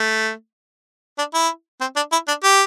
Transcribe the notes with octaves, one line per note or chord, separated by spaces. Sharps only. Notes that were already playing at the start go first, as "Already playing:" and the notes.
Already playing: A3
D4
E4
C4
D4
E4
D4
G4